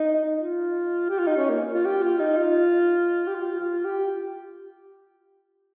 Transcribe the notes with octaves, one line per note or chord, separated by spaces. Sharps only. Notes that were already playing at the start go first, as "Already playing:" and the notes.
Already playing: D#4
F4
G4
F4
D#4
C#4
A#3
F4
G4
F4
D#4
F4
G4
F4
F4
G4